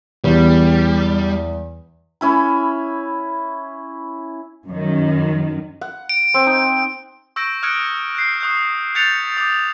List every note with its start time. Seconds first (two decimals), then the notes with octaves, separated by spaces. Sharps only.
0.24 E2 G3
2.21 C#4 E4 B5
4.67 F#2 D#3
5.81 F#5
6.09 D7
6.34 C4
6.47 D#4
7.36 C#6 E6 G6 A#6 D7
7.62 D#6 F6 F#6 G#6 C#7 D7
8.15 F#6 G6 C7
8.40 C#6 D#6 F#6 G6
8.95 F#6 G6 A6 B6 C#7 F7
9.37 D6 D#6